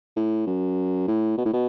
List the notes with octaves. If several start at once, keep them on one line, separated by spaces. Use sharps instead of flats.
A2
F#2
A2
B2
A2
B2